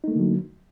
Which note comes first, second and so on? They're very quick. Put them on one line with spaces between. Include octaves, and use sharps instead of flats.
D#4 A3 A#3 D3 F#3